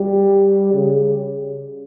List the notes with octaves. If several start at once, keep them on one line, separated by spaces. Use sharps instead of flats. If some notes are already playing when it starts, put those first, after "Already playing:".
Already playing: G3
C#3